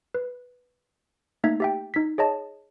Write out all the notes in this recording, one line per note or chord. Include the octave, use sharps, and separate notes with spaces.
B4
A3 A#3 D#4 E5 G#6
G4 E5 G5
D#4 B6
G#4 C#5 D#5 A5